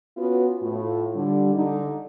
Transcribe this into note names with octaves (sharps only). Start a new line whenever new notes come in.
B3 C#4 F4 F#4 B4
A2 F4
D3 G3
D3 D#4